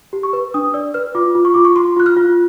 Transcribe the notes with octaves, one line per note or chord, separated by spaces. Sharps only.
G4
C#6
B4
D4 D#6
D5 E6
B4 F6
F4 D6
F4
C#6
F4 D6
C#6
F4 C6
F4 F#6
F6
F4